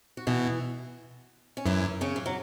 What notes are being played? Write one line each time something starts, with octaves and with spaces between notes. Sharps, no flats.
F#4
B2 E3 E4
C#4
F#2 E3 E4
C#3 C#4
E3
F#3